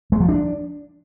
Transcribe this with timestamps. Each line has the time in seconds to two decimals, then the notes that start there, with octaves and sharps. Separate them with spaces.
0.12 G#3
0.20 F3
0.29 D4